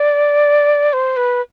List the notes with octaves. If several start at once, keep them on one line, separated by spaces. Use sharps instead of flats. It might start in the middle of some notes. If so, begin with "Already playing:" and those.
Already playing: D5
C5
B4